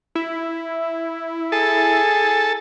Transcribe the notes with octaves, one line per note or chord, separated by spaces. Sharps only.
E4
G#4 A4